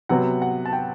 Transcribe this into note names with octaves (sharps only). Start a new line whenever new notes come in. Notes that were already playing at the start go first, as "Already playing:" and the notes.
C3 F#3 B3 F#5
F#5
A5
G5